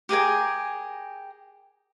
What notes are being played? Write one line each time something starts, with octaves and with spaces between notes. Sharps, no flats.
G4 G#4 A#4 G#5